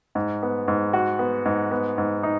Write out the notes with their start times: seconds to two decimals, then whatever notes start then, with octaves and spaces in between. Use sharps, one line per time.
0.15 G#2
0.42 B3
0.68 G#2
0.93 F#4
1.19 B3
1.45 G#2
1.71 B3
1.98 G#2
2.23 D#4